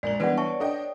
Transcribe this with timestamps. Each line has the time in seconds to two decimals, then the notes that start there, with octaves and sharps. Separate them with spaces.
0.03 A#1 G#3 A#4 D5 F#7
0.20 E3 G3 G#3 B3 D4 B4 D5 F#5
0.38 C#5 D5 E5 A5 C#6
0.60 D4 A4 D#5 G5